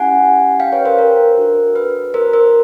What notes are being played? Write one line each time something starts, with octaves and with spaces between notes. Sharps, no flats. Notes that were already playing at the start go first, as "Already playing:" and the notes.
Already playing: C#4 E4 G4 F#5 G#5
F5 G5
B4 C#5
A#4 C5
A#4
D4 F#4 A4
B4
A#4 C5
A#4 C5